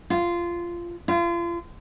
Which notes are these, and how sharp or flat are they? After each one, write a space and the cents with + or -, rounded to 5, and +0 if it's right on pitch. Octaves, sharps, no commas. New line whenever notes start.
F4 -15
F4 -35